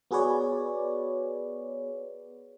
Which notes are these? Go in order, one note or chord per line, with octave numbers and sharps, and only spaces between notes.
B3 F#4 G#4 B4 C#5 D5